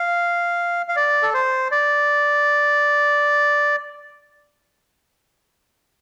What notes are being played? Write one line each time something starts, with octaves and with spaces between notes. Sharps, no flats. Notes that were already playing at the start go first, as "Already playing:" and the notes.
Already playing: F5
F5
D5
A4
C5
D5